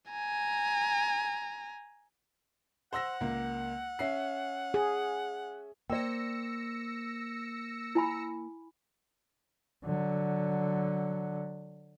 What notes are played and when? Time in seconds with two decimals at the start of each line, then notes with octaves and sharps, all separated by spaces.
0.11 G#5 A#5
2.93 C5 F#5 E6 A#6
3.21 C#2 A#3
3.99 C#4 E5 C7
4.74 G#4
5.90 A#3 C5 D5 G5 E6 A#6 C#7
7.95 E4 G#5 B5
9.85 D3 F#3